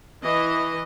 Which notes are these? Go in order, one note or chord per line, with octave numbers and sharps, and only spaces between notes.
E3 D#5